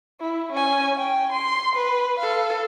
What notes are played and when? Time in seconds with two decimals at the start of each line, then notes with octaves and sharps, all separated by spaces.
0.20 E4
0.52 C#4 G#5
0.97 G5
1.32 C6
1.75 B4
2.19 A4 F5